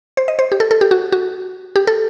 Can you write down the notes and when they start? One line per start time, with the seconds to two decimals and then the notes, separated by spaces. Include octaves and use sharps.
0.17 C5
0.28 D#5
0.39 C5
0.52 G4
0.60 A4
0.71 A4
0.81 G4
0.91 F#4
1.12 F#4
1.76 G4
1.87 A4